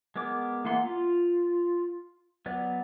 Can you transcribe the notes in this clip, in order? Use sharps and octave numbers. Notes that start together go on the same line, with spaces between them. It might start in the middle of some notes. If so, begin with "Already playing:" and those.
G#3 B3 A#4 D6
E3 A#3 B3 F#5 C6
F4
F#3 B3 B4 D5